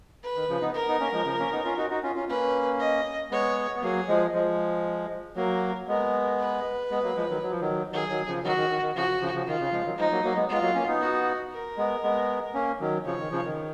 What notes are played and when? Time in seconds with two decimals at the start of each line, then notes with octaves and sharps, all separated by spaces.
0.23 B4
0.36 D#3
0.49 C#3 F3
0.61 B3 D#4
0.74 A#4
0.88 B3 D#4
1.00 A#3 C#4
1.13 F3 G#3
1.25 C#3 F3
1.39 A#3 C#4
1.52 B3 D#4
1.65 C#4 F4
1.77 D#4 F#4
1.90 D#4 F#4
2.03 C#4 F4
2.16 C#4 F4
2.29 A#3 C#4 B4
2.79 D#5
3.31 G#3 B3 C#5
3.76 B3
3.82 F#3 A#3 G#4
4.08 F3 G#3
4.34 F3 G#3
5.36 F#3 A#3 A#4
5.88 G#3 B3 A#4
6.39 B4
6.91 G#3 B3
7.03 F#3 A#3
7.16 F3 G#3
7.29 D#3 F#3
7.42 F#3
7.51 F3
7.61 D#3 F#3
7.92 D#3 F#3 G#4
8.10 D#3 F#3
8.28 C#3 F3
8.44 D#3 F#3 F#4
8.57 D#3
8.70 D#3
8.82 D#3
8.96 C#3 F3 F#4
9.21 C#3 F3
9.34 C#3 F3
9.47 D#3 F4
9.60 C#3
9.72 F3 G#3
9.85 D#3 F#3
9.98 F3 G#3 D#4
10.11 F#3 A#3
10.24 F#3 A#3
10.36 G#3 B3
10.49 G#3 B3 F4
10.62 F#3 A#3
10.75 A#3 C#4
10.87 B3 D#4
11.01 F#4
11.52 A#4
11.77 G#3 B3
12.03 G#3 B3
12.54 A#3 C#4
12.80 D#3 F#3
13.05 C#3 F3 C#5
13.19 D#3
13.31 C#3 F3
13.45 D#3